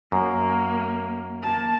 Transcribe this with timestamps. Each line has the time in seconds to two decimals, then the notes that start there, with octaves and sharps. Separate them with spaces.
0.12 F#2 A#3
1.43 A#3 A5